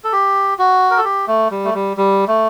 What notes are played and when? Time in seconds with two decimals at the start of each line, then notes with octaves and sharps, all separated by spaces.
0.04 A4
0.13 G4
0.59 F#4
0.91 A#4
0.98 A4
1.05 G4
1.27 A3
1.51 G3
1.65 A3
1.74 G3
1.97 G3
2.28 A3